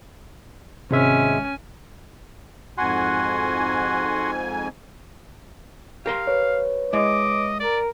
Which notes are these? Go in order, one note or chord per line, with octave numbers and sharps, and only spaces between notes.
G#1 C3 G#3 C#4 E5 G#5
F2 G#2 F#4 F#5 G#5 C6
G4 A#4 F5 C6
B4 C#5
G#3 E4 D#5 D6
A#4 D5